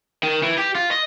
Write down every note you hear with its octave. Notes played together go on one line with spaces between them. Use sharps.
D#3
E3
G4
F4
D#5